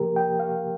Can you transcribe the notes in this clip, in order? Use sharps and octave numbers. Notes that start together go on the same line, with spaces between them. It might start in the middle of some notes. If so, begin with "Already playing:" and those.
Already playing: C3 F3 A#3 G4 A#4
G5
F5